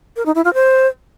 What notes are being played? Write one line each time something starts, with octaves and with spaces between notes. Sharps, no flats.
A#4
D#4
E4
F4
C5